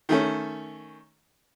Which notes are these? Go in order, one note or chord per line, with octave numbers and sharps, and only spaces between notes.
D#3 A3 C#4